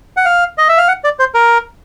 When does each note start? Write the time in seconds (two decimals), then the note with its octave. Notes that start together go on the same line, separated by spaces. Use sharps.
0.17 F#5
0.25 F5
0.58 D#5
0.69 E5
0.78 F5
0.88 F#5
1.04 D5
1.19 C5
1.35 A#4